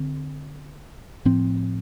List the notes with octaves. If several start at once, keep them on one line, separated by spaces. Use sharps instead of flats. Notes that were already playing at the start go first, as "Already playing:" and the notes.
Already playing: D3 C4
A2 F3 C4